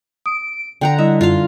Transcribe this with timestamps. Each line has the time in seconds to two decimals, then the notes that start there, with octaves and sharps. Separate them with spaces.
0.26 D#6 D7
0.81 D3 F#5 G5 A#5
0.98 G3 E4 D#5 E5
1.21 F#2 F4 F5